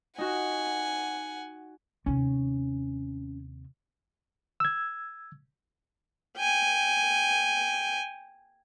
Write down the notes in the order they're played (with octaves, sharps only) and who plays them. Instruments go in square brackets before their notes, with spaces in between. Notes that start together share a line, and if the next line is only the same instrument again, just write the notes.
[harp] D#4 F#4 [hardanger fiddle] F#5 G#5
[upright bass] D#2 C3 [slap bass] C#4
[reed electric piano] E6 G#6
[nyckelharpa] G5 G#5